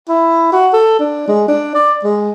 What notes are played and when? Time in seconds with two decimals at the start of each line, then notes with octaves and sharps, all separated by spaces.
0.09 E4
0.52 F#4
0.73 A4
0.99 D4
1.28 G#3
1.48 D4
1.75 D5
2.04 G#3